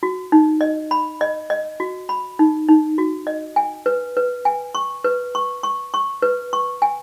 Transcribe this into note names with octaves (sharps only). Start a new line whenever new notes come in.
F#4
D#4
D#5
B5
D#5
D#5
F#4
B5
D#4
D#4
F#4
D#5
G#5
B4
B4
G#5
C#6
B4
C#6
C#6
C#6
B4
C#6
G#5